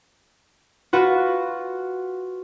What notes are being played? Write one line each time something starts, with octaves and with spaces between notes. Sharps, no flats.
F4 F#4 B4